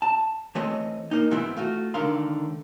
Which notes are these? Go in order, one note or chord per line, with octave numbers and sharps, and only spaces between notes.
A5
E3 A3 C4 C#5 D#5
A#3 D#4
G#2 E3 B3 C4 E4
A3 F4 F#4
C#2 D3 D#3 A#4 F5 C6